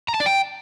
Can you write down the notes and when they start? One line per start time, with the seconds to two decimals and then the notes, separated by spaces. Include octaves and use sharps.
0.08 A#5
0.14 A5
0.20 D5
0.26 G5